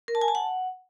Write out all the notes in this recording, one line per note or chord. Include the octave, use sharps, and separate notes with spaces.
A#4
A5
G#5
A5
F#5